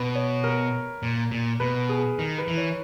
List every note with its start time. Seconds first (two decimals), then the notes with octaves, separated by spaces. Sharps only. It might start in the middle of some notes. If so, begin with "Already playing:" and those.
Already playing: B2 B4
0.15 C#5
0.44 A#4
1.03 A#2
1.31 A#2
1.60 B2 B4
1.89 G#4
2.18 D#3 A#4
2.38 B4
2.48 E3
2.57 C#5